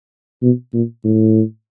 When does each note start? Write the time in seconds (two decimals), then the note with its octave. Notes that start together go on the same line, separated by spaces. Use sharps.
0.42 B2
0.74 A#2
1.05 A2